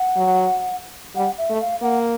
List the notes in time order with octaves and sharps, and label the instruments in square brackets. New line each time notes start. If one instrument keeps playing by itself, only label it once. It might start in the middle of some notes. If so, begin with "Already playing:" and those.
Already playing: [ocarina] F#5
[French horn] F#3
[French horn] G3 [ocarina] F#5
[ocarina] E5
[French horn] A3
[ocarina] F5
[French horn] A#3 [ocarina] F#5